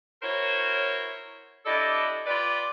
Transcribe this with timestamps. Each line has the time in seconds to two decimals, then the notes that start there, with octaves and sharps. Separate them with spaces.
0.23 E4 F#4 A#4 C5 C#5
1.66 D4 E4 G4 A4 D5 D#5
2.26 F4 G4 B4 D5